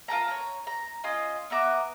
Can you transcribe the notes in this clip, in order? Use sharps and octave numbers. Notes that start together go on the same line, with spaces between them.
F4 A#4 A5 A#5
C#5 A#5
A#5
C#4 F4 D#5
B3 E5 A#5 D6